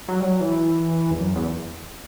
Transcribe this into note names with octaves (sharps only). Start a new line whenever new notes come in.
F#3
G3
F#3
E3
E2
F#2
E2